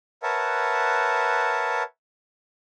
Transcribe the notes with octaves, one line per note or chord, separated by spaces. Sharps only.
A#4 B4 C#5 E5 F#5 A5